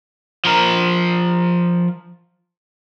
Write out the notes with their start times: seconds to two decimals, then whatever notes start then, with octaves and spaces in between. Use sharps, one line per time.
0.45 F3 A#4